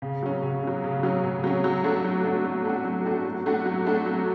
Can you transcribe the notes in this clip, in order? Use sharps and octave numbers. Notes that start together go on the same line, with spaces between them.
C#3
F#3 C#4
C#3
F#3 C#4
C#3
F#3 C#4
C#3
F#3 C#4
F#3
A3 D4 F#4
F#3
A3 D4 F#4
F#3
A3 D4 F#4
F#3
A3 D4 F#4
F#3
A3 D4 F#4
F#3
A3 D4 F#4
F#3